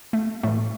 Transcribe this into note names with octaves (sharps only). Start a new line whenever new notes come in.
A3
A2 E3 A3